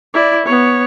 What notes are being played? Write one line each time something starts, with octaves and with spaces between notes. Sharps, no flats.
E4 D5
B3 C#5